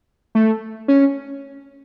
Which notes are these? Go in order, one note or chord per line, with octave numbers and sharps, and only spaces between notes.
A3
C#4